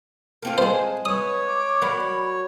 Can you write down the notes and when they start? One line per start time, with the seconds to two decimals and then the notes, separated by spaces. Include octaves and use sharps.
0.42 A#3 C4 F4 A5
0.58 G#3 G#4 C5
1.05 B4 C#5 D#6
1.47 D6
1.82 F#3 A#4 D5 B5